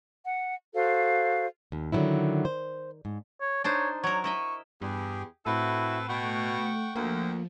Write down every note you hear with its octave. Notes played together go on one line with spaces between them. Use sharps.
F#5
F#4 A4 C5 F5
D#2
D3 D#3 F3 F#3 E4
C5
G#2
C#5
D4 D#4 C5 C#5
F#3 A#4 C#5
E4 D#5 E5 C#6
E2 G2 G4 G#4
A2 C4 E4 F#4 A4 B4
B2 A3 F#5 G5 C#6
D2 F3 A#3 F#5 G5